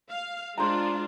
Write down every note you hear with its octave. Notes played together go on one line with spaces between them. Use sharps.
F5
G#3 D4 F4 C5 A#5